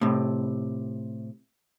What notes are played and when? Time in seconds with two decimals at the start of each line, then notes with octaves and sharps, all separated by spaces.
0.01 A2 C3